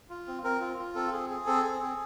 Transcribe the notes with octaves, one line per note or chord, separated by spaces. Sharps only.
F4
C4
C4 A#4
F4
F4
C4 A4
G#4
G#4
C4 A4
G#4
C4